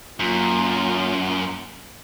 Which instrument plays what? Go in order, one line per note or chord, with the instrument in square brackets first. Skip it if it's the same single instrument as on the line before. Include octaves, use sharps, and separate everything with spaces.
[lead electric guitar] F#2 [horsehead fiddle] A#3 F4